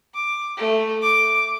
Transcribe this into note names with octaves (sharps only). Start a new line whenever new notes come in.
D6
A3
D6